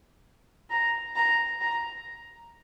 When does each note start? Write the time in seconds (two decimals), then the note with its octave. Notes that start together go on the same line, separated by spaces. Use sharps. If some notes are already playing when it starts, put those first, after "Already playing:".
0.71 A#5
1.16 A#5
1.61 A#5